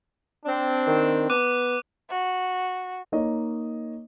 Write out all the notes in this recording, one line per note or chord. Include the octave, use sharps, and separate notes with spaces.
C4 D4
D#3
B3 D6 F#6 D#7
F#4
A#3 D#4 C#5 D#5